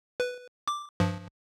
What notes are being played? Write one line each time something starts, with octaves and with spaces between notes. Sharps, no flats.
B4
D6
G2 F3